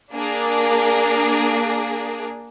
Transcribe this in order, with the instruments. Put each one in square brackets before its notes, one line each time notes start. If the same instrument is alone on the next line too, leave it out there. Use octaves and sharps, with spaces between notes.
[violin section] A#3 D4 G#4